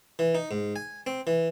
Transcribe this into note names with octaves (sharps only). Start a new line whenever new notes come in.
E3
D#4
G#2
G#5
C4
E3